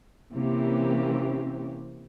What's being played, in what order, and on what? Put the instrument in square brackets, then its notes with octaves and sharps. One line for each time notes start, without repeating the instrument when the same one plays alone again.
[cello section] C3 E3 A#3 C4 C#4 G4